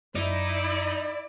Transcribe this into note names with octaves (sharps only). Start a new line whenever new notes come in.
F#2 D#4 E4 D5